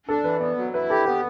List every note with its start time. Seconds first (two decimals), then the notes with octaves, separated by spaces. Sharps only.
0.09 D4 A4
0.24 E3 B4
0.40 B3 D5
0.57 F#3
0.74 E4 B4
0.90 G4 A4
1.06 B3 B4